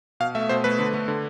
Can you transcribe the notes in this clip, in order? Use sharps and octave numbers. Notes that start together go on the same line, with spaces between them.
B2 F5
A3 E5
B2 C5
A3 B4
D3
A3
D3